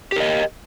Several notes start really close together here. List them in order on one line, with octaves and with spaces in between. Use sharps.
G4 A#4 D#5